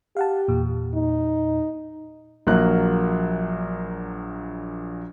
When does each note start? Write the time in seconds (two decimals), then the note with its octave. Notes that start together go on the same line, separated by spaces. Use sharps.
0.17 G4 F5 F#5 A5
0.48 E2 A#2
0.94 D#4
2.47 A#1 A#2 F#3 A#3 A#4 F#6